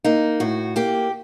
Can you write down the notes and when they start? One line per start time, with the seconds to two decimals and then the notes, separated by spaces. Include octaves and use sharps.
0.04 A#3 D#4
0.40 A2 F#4
0.76 A#3 G4